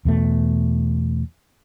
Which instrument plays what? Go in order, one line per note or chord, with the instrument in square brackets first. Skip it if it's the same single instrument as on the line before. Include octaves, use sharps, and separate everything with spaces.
[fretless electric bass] E2 B2 A3